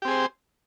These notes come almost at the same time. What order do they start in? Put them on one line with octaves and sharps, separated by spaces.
G4 C4 G#4 C5